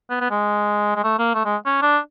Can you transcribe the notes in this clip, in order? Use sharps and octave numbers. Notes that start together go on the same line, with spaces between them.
B3
B3
G#3
G#3
A3
A#3
A3
G#3
C#4
D4